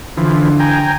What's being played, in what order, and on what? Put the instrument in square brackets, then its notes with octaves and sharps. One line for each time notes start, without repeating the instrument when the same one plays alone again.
[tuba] D3 [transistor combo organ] E3 F3
[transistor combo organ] G5 G#5 A#5